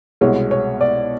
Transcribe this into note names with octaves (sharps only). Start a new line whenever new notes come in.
C2 B2 G#3 C#5
C#5
D5